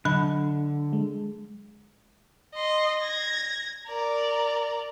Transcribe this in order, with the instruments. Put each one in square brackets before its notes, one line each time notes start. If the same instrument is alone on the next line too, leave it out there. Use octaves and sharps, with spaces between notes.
[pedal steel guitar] D3 [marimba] F#3 B5
[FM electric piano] G#3
[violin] D#5 C6
G#6 A#6
A#4 D5